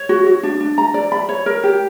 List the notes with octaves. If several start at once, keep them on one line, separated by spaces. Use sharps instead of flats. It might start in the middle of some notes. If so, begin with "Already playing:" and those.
Already playing: C#5
F#4
F#4
D4
D4
A#5
D5
B5
C#5
A#4
G4